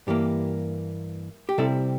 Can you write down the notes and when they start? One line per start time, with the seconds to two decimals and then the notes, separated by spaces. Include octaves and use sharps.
0.07 G2 E3 A#3 G4
1.49 G4
1.58 C3 G3 C4 E4 A4